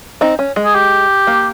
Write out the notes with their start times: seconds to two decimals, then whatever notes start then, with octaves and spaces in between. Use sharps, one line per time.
0.21 C4 D#4
0.39 C#4
0.56 G#3
0.64 G#4
0.75 G4
1.27 A#3